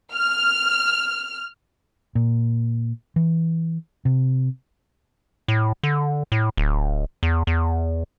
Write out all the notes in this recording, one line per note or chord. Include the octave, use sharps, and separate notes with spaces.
F6
A#2
E3
C3
A2
D3
A2
D1
E2
E2